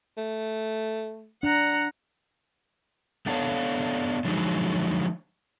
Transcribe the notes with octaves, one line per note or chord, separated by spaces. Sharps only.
A3
D4 F#5 A#5
A3 B3 D4 A4 C#5 F5
D3 F3 F#3 G#3 D#4